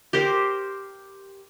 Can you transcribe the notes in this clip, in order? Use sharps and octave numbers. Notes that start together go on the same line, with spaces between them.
G4 A#4 C5